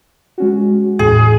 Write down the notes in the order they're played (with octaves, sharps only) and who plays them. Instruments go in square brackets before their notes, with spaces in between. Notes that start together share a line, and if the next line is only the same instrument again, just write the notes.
[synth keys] G#3 C#4 F#4
[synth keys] E2 A2 [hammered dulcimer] G#4